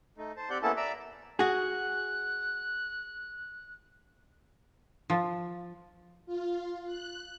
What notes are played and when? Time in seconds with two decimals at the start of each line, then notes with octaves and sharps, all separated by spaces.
0.18 A3 D#4
0.37 C5 A5
0.50 C4 G4 D5 F#5 G6
0.62 A#3 B3 C#4 E4 A4 A5
0.77 D5 E5 A#5 D6 E6
1.39 F#4 G#4 F#6
5.10 F3
6.26 F4
6.86 F#6